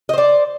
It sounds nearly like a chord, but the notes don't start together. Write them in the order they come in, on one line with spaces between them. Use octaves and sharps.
D#5 C5 D5